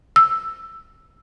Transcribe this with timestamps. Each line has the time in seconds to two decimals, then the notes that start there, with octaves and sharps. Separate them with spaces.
0.16 E6